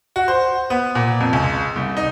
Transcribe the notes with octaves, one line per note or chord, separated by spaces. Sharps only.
F#4
C5
B3
A#2
F2
C#2
C2
D#4